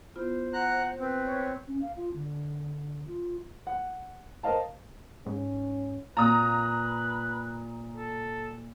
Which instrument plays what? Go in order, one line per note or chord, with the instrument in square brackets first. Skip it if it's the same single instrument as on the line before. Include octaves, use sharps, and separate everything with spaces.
[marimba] B3 E4 F4 [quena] C5
[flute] F#5 [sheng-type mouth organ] A#5 F#6
[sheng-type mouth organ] C4 [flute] B4
[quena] C#5
[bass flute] C#4
F5
F4
D3
F4
[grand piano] F#5
A#4 C5 D#5 F5 A5
[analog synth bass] G#2 [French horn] C#4
[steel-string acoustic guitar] A#2 [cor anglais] B4 [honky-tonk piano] A#5 D#6
[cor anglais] A4